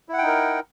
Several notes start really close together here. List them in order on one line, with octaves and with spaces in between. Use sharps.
E4 F#5 G5 D#4 A#4